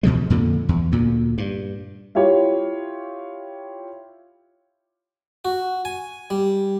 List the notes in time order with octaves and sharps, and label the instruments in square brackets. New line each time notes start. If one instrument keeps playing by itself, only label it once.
[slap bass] E2 B2 F3 G#3
F2 A#2 D3
E2
D2 A#2
G2
[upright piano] E4 F4 G4 C#5
[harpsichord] F#4
G#5
G3